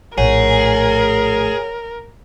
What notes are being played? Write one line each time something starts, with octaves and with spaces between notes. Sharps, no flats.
A#1 A2 G#4 A#4 C#5 F#5